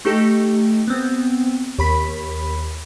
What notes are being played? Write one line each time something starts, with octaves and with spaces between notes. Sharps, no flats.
A3 D#4 G4 A4
B3 C4
D#2 B5 B6